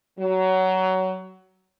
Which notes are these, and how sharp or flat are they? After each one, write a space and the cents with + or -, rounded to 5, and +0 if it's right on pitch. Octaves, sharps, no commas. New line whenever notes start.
F#3 +20